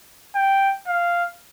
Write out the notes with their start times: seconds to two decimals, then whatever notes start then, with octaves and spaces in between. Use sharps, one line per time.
0.35 G5
0.88 F5